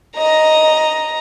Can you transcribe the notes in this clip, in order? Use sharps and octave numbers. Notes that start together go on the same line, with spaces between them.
D#5 A#5